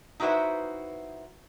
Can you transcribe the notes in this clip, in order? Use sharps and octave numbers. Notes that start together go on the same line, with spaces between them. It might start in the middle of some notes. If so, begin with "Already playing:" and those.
D#4 E4 F#4 B4 C5 E5